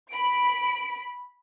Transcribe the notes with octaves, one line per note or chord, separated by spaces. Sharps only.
B5 D7